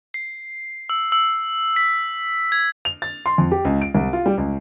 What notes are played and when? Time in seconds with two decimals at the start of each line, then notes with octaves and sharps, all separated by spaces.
0.14 C7
0.90 E6
1.12 E6
1.76 B6
2.52 G#6
2.85 F7
3.02 A6
3.26 C6
3.38 F2
3.52 G4
3.65 C#2
3.81 D7
3.95 C2
4.13 F4
4.26 G3
4.38 C#2